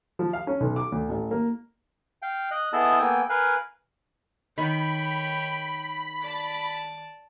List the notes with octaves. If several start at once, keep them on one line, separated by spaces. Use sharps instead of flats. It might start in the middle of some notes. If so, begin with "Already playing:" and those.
F3
F5
C#4
B1
D6
D2
A1
A#3
F5 G5
D#5 F#6
B3 E4 G#4 A4 D#5 A5
A#3 B3 A4 G5 G#5
A#4 B4 F5 G#5 F#6
D#3 C#5 G5 B5
D5 A5